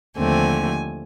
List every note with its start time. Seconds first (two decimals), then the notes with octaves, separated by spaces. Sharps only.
0.17 D#2 D3 F3 A3 C4 G#5